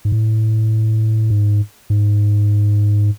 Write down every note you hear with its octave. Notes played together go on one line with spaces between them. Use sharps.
G#2
A2
G#2
G#2